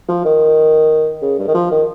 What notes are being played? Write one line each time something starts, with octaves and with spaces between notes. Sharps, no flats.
F3
D#3
C#3
G2
D#3
F3
D#3